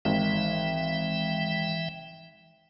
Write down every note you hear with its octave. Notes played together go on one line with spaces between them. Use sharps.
G#1 E3 E5 G5